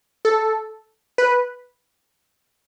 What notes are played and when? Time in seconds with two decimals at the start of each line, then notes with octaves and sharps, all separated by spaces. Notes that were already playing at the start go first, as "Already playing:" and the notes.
0.25 A4
1.18 B4